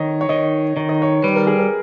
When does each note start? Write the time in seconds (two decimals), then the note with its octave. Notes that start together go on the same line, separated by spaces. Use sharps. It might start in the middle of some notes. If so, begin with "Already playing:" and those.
Already playing: D#3 C#5 D#5
0.21 C#5
0.29 D#3 D#5
0.77 D#3 C#5
0.89 D#5
1.02 C#5
1.23 G3 B4
1.36 A#4
1.47 G#4
1.59 A#4